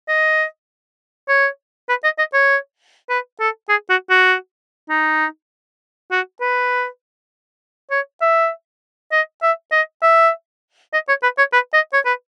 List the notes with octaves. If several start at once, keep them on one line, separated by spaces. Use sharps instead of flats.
D#5
C#5
B4
D#5
D#5
C#5
B4
A4
G#4
F#4
F#4
D#4
F#4
B4
C#5
E5
D#5
E5
D#5
E5
D#5
C#5
B4
C#5
B4
D#5
C#5
B4